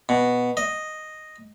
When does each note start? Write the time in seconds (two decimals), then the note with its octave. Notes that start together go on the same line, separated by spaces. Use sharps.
0.09 B2
0.57 D#5